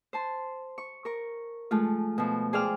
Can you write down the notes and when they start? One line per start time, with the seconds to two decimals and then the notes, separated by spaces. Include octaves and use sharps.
0.13 C5 A5 C6
0.78 C#6
1.05 A#4 C#6
1.71 F3 G#3 A3 F4
2.18 B2 F3
2.53 G#4 C5 D5 F5 G5 F6